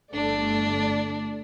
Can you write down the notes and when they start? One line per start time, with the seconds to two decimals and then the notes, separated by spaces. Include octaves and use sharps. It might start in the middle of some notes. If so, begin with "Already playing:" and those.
0.14 G1 A3 D4 D5